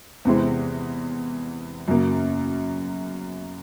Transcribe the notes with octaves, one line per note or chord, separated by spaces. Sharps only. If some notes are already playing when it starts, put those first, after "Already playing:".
E2 C3 E3 G#3 C4
F#2 C#3 F#3 A#3